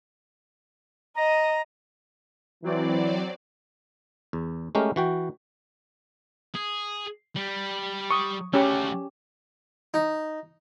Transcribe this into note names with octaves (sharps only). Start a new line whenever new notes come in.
D#5 A#5 D#6
E3 F#3 C4 D5
E2
G#3 A3 C#4 G4 A#4
E3 F#4 G5
G#4
G3
C#6 D#6
A3 C#4 F#4 G4
D#4